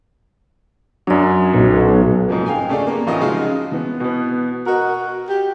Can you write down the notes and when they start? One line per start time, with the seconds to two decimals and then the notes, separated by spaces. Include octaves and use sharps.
1.07 F#2 F#3 D4 D5
1.54 B1 A#2
2.29 G#2 C#3 F3 A#3
2.46 F5 G5 G#5
2.69 C#3 A3 D4 G#4
2.87 A#3 B3
3.07 A1 C#4 F4 D#5
3.20 C#3 F3 G#3 D#4 F4 F#4
3.72 E3 B3
4.00 B2 B3
4.66 F#4 A#4 D#5
5.29 G4